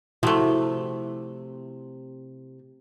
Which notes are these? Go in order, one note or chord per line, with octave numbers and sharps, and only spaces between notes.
C3 F3 A3 E4 F#4